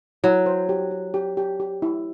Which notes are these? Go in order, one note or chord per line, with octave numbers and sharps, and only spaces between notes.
F#3 E4
C5
G4
G4
G4
G4
G4
E4